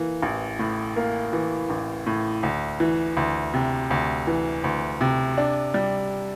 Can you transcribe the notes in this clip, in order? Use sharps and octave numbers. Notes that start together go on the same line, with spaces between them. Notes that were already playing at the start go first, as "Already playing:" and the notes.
Already playing: E3 A#3
A1
A2
A#3
E3
A1
A2
D2
E3
D2
C3
D2
E3
D2
C3
D4
G3